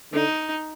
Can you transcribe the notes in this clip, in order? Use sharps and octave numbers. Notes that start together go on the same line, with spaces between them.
D3 D#4